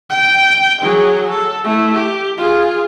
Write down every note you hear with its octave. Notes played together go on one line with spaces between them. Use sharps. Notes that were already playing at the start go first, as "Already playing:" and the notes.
G5
F#3 G#4
A4
A3 E4
G4
F4 G#4